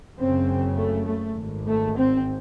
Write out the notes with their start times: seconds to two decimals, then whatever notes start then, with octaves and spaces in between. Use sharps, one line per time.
0.17 F#1 F#2 C#3 C4
0.77 A3
1.07 A3
1.37 G#1 G#2
1.67 A3
1.97 C4